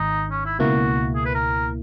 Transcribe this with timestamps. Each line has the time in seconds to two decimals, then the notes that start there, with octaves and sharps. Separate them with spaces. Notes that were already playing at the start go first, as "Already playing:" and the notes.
Already playing: G#1 G#2 D#3 D#4
0.31 C#4
0.45 E4
0.59 C#2 B2 A#3 E4 F#4
1.15 G#4
1.25 B4
1.35 A#4